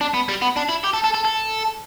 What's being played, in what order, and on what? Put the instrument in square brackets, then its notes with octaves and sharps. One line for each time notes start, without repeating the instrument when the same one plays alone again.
[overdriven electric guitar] D4
B3
G3
B3
D4
E4
G4
A4
A4
A4
A4